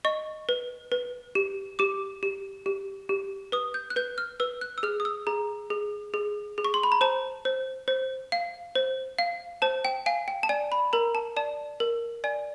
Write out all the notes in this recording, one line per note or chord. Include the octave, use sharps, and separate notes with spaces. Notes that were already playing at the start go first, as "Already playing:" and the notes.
D#5 C#6
B4
B4
G4
G4 D6
G4
G4
G4
B4 D#6
G6
F#6
B4 G6
F6
B4 E6
F#6
E6
G#4 F6
D#6
E6
G#4 A#5
G#4
G#4
G#4
C#6
C6
B5
A#5
C5 A5
C5
C5
F5
C5
F5
C5 A5
G5
F5 G#5
G5
A5
D5 G#5
B5
A#4 A#5
A5
D5 A5
A#4
D5 G#5